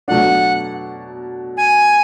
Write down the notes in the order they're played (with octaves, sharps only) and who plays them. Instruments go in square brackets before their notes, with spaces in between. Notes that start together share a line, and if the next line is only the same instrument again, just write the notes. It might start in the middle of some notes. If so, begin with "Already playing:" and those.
[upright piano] B2 F#3 A3 D4 [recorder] F#5
[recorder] G#5